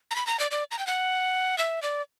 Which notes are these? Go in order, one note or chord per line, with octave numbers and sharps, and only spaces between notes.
A#5
B5
A#5
D5
D5
A#5
G5
F#5
E5
D5